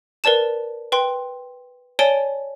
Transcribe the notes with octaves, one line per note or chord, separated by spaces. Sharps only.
A#4 B4 D5 A5 E7
B4 G5 C6
C#5 D5 G#5 A5 D7 G7